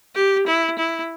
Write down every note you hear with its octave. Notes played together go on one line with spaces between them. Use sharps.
G4
E4
E4